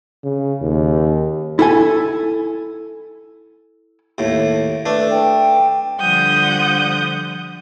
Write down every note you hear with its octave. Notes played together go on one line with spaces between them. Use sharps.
C#3
D#2
E4 A4 G#5
D#2 A2
A3 D4 B4
G5
D3 F3 G3 F#5 D#6 G6